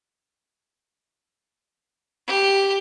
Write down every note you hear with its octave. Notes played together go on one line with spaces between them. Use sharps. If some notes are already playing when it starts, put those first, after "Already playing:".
G4